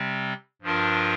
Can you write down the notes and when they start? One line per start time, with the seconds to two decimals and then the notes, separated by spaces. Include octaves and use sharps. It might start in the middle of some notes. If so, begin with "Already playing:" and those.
Already playing: C3 G3 C4
0.62 G2 F3 D4 F4 A#4